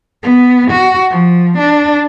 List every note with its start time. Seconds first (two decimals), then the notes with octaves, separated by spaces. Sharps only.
0.23 B3
0.71 F#4
1.11 F3
1.59 D4